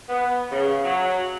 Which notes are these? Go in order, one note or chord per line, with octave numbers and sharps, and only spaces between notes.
B3
C#3
F#3